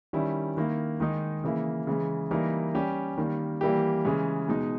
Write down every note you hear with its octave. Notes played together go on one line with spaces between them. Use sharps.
D#3 G3 C#4 E4
D#3 A#3 E4
D#3 G#3 D#4 G#4
C#3 E3 A#3 E4
C#3 E3 G#3
E3 G3 A#3 D#4 A#4
G3 C#4 G4
D#3 G3 A#3
E3 G3 A#3 E4 G4
C#3 E3 G#3 C#4
B2 G#3 D#4